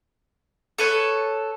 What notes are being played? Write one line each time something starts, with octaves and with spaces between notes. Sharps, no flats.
A4 B4 C#5